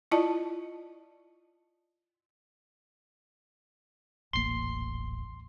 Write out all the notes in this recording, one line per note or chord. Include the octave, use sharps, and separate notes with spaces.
E4 F4 D5 D#5 A5
D#1 A1 A#3 C6 C7